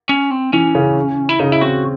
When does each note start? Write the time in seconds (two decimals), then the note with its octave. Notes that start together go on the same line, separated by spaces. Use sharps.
0.09 C#4
0.31 C4
0.53 E3 C#4
0.75 C#3
1.29 E4
1.39 C#3 D#4
1.52 E4
1.61 C4 F#4